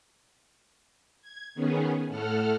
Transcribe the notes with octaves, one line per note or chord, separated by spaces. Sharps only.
G#6
D#3 B3 C#4 G#4
A2 A4 F#5 F6